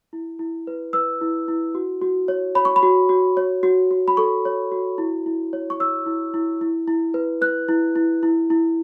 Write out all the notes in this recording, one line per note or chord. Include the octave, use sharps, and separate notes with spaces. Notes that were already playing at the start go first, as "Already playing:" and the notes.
E4
E4
B4
B4 E6
E4
E4
F#4
F#4
C#5
C#5 B5
C#6
B5
F#4
F#4
C#5
F#4
F#4
B5
A4 C#6
C#5
F#4
E4
E4
C#5
C#6
C#5 E6
E4
E4
E4
E4
B4
B4 F#6
E4
E4
E4
E4